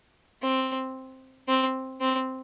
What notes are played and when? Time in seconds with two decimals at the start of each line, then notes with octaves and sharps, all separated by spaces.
0.42 C4
1.48 C4
2.01 C4